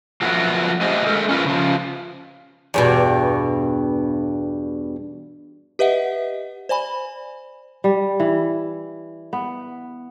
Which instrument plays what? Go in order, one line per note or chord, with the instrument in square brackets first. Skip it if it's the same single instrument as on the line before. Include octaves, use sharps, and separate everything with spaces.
[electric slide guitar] F3 F#3 A3 B3 F#4 A#4
A3 G4 G#4 C5 D#5
G#3 A4 A#4
C#4 F4 A#4 B4
C#3 F3
[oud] E2 G2 B2
[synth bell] G4 B4 D#5 E5 F#5
C5 D5 G#5 B5
[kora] G3
E3
B3